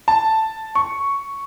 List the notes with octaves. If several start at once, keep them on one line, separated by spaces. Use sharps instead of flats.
A5
C#6